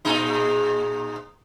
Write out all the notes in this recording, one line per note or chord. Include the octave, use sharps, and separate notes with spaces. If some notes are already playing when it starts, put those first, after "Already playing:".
A#2 G#3 D#4